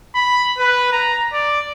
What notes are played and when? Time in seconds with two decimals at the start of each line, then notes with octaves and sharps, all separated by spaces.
0.15 B5
0.58 B4
0.92 A#5
1.33 D5